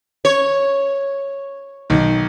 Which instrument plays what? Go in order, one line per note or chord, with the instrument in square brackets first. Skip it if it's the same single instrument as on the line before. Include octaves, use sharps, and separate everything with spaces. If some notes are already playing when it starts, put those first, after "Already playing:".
[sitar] C#5
[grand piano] B1 D#3